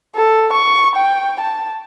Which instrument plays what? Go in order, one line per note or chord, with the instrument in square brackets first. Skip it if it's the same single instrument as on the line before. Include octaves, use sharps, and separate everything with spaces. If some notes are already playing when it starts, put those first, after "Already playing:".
[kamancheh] A4
C#6
G5
A5